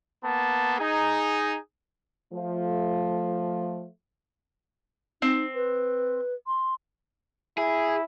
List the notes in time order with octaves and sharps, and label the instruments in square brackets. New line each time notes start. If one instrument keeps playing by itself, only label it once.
[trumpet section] A#3 B3 A5
D#4 G#4
[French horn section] F3 A3
[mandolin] C4 [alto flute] D#4
[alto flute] B4
C6
[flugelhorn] E4 [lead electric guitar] G#4